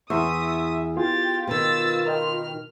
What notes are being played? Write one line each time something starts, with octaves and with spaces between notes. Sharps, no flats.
E2 E5 C6 C#6 D#6
B3 F4 G4 G#4 A6
B2 D#3 E6 A6
A#4 D#5 G5 F6